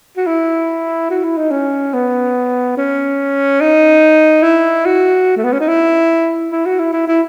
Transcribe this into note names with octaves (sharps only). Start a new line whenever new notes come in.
F#4
E4
F#4
E4
D#4
C#4
B3
C#4
D#4
E4
F#4
A3
B3
C#4
D#4
E4
E4
F#4
E4
E4
E4